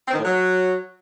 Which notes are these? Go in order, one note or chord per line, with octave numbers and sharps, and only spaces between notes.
C4
D#3
A2
F#3